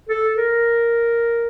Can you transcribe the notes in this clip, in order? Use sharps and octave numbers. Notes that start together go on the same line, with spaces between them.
A4
A#4